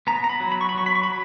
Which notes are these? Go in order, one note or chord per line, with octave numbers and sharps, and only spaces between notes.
B3 A#5
A#5
B5
F#3
B5
C#6
B5
F#3 C#6
B5
C#6
F#3 B5